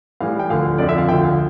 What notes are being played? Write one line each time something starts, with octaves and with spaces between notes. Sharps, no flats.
A2 E3 G3 F5
G5
D2 D3 F3 F5
F2 D3 F3 D5
E5
F5
D2 D3 F3 G5
F5